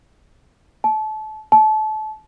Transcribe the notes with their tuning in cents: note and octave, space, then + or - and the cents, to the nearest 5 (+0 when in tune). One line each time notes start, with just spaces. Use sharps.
A5 -30
A5 -30